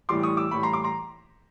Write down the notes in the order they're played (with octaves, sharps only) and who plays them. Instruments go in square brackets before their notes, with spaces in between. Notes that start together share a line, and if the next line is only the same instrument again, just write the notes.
[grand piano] A2 E3 G3 C6 D6
C#6 D#6
D6 E6
A2 E3 G3 B5 C#6
A#5 C6
C6 D6
A#5 C6